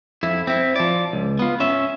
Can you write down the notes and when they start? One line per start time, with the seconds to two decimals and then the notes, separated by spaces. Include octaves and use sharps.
0.23 F2 E4
0.47 C4 E4
0.76 F3 D5
1.13 C#2
1.39 B3 F4
1.60 C#4 E5